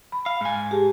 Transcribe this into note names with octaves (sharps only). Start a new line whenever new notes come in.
B5
F5
G#2 G#5
G4 G#4 A5